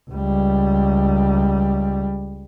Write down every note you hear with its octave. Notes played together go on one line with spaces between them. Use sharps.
C#2 G3